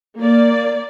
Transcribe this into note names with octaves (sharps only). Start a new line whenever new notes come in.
A#3 D5